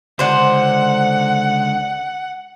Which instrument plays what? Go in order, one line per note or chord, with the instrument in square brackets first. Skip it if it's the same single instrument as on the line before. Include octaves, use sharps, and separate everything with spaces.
[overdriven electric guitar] C#2 [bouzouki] D3 C5 [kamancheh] F#5